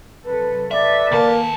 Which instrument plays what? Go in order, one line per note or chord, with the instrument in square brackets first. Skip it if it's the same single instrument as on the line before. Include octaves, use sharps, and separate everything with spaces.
[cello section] C3 F#3 A4 [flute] B4
[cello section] A4 B4 [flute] D5 [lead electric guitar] E5
[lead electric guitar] D#3 A5 [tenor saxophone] A#3